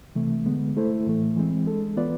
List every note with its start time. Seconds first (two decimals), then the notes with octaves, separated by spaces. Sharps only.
0.15 C3 E3 A3
0.46 D3 G#3 B3
0.77 A3 E4 A4 C5
1.06 A2 E3 A3
1.37 E3 G#3 C4
1.66 G#3 D4 A4
1.96 E3 B3 F4 B4 D5